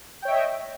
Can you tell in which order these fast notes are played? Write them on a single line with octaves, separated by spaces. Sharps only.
G5 C#5 E5 D#5